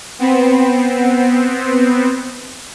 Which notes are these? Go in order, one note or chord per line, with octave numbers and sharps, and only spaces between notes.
B3 C4